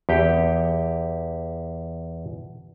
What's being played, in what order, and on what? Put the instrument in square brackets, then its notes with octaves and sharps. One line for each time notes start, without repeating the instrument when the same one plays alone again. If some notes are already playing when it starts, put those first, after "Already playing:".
[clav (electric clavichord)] E2 G4 G5